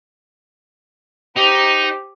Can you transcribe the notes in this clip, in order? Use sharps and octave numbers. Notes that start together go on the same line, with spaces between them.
D#4 G4 C5